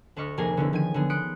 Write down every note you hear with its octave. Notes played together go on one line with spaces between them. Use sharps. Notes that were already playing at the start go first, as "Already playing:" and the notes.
D2 D4 D#5 C#6 F6 B6
F1 A#3 G#4 A#4 G#5
D3 B3 C#4 D#4 E4
D#3 F3 G#5 G#6 D#7
D3 F3 F#3 B3 G#4
C6 D#6 F#6 B6 C#7 D7